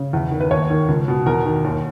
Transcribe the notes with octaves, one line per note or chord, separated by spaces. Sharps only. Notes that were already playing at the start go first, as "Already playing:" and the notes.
Already playing: C#3
E2
D#3
B4
D#2 C#5
D#3
C#2
B2
E2 A#4
D#3
D#2